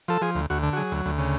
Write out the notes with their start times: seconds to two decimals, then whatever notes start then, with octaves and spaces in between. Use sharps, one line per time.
0.08 F3 A4
0.22 F3 G#4
0.35 D2
0.50 D2 F#4
0.63 D3
0.73 F#4
0.77 F#3 G#4
0.92 D2
1.06 D2
1.18 C#3